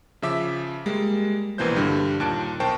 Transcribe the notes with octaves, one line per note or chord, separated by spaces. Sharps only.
C#3 F3 E5 D6 B6
G3 G#3 A#3
A#1 B2 E3 A#3 C5 G6
G2 D3 G3
D#2 A#2 A5 F#6 D7
B1 A#4 C5 G5 A5 C#6